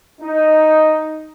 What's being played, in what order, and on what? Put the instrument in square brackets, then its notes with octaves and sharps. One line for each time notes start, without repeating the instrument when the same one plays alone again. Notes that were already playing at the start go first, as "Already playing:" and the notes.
[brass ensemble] D#4